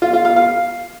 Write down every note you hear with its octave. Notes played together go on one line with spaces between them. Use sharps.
F4
F4
F5
F5